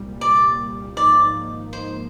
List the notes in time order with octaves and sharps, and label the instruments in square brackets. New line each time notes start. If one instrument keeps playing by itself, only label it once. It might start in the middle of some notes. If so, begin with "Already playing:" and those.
Already playing: [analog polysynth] C2 A#2 G3
[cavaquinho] D5
[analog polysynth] G#1 G#2 F3 A#3 D#4 [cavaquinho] D5
[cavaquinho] C5